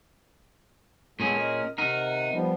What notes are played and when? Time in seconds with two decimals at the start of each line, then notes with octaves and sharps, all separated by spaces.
1.20 A#2 G#3 B3 C#4 G#4 A4
1.36 A#4 D#5
1.78 C3 D#4 A#4 F#5
2.32 F3 G3 B3